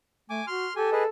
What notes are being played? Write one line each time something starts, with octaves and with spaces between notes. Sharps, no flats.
A3 G#5 D6
F#4 C6 F6
G4 A4 G#5
G#4 B4 D#5